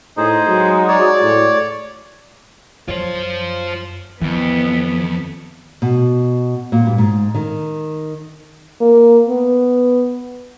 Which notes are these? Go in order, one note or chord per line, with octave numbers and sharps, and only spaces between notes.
A2 D#4 G#4 C5
F#3 G#3 F#4
C#5 D5
A2
F#2 F4 C5 C#5
F2 D#3 E3 B3
B2
A#2
G2
G#2
D#3
A#3
B3